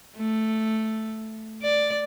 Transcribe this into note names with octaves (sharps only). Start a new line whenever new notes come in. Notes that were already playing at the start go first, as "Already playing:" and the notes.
A3
D5